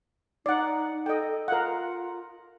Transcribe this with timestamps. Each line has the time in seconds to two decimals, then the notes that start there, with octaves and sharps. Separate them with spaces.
0.46 D#4 D5 F#5
1.06 A4 D#5 G5
1.48 F4 A#4 F5 F#5